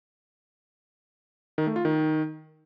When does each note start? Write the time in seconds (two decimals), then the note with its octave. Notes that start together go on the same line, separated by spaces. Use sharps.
1.58 D#3
1.67 A3
1.76 F4
1.85 D#3